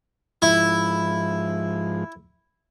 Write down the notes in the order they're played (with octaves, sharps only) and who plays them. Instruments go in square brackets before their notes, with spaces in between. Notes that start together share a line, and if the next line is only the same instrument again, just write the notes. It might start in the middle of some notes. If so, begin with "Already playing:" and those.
[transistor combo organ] G#2 F3 [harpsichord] E4